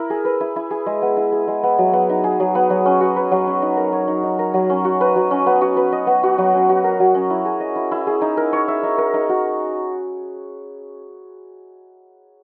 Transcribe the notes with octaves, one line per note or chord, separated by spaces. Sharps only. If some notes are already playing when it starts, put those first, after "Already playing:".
Already playing: E4 A#4
G#4
B4
E4
E4
G#4
G#3
B3
E4
G#4
G#3
B3
F#3
B3
D#4
G#4
F#3
B3
F#3
C#4
F#4
B4
F#3
C#4
D#4
A#4
C#5
D#4
D#4
A#4
F#3
C#4
F#4
B4
F#3
C#4
B3
F#4
B4
D#5
B3
F#4
F#3
C#4
F#4
A#4
F#3
C#4
E4
G#4
D#5
E4
E4
G#4
D#4
A#4
C#5
E5
D#4
A#4
D#4
F#4